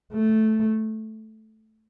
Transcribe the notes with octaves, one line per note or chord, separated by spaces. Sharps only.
A3